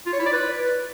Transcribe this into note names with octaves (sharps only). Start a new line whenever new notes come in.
F4
C#5
E4
D5
B4